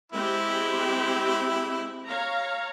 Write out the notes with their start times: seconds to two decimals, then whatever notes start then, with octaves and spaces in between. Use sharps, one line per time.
0.12 G#3 C4 E4 G4
2.06 C#5 F5 A#5